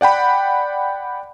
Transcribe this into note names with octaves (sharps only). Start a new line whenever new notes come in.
D5 F#5 G5 B5